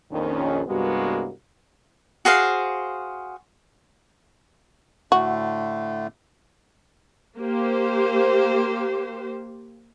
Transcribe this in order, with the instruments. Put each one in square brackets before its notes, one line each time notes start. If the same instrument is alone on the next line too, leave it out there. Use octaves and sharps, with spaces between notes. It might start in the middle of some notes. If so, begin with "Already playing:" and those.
[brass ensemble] A#1 F2 D#3 C#4
C2 G2 G#3 A#3 B3 F#4
[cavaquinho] F#4 G#4 C5 F5
[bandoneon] A2 D3 A3 [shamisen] F#4
[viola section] A#3 G4 C5